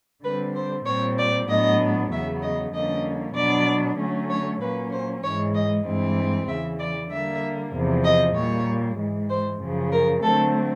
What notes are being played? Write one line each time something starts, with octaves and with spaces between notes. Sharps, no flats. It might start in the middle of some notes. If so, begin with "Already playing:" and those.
D3 G3 C4 B4
C5
A#2 G3 C4 C#5
D5
A2 F#3 B3 D4 D#5
E2 C#3 F#3 B3 E5
D#5
F2 D3 G3 A#3 C#4 D#5
B2 F#3 B3 D4 D5
D3 F#3 A3 C#4
C#5
A#2 F#3 A#3 C#4 B4
C5
G#2 E3 G#3 C#5
D#5
G2 E3 G#3 C4
E2 C#3 E3 E5
D5
D3 G3 A#3 E5
E2 C3 F3
D#5
A#2 G3 A#3 C#5
G#2 E3 G#3
C5
F#2 C#3 F3
A#4
D3 F#3 A3 C4 A4